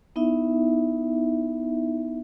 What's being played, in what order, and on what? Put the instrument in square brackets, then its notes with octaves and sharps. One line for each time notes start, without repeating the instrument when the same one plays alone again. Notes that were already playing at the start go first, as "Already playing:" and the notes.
[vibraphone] B3 D#4 E4 E5